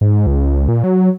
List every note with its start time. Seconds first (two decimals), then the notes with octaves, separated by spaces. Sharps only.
0.01 G#2
0.27 C#2
0.68 A#2
0.84 F#3